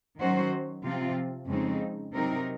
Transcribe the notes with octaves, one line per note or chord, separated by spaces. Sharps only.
D#3 F#3 C#4 F#4 C5
C3 F3 C4 F4
F2 C#3 G#3 C4 D#4
C3 F#3 C4 D#4 A#4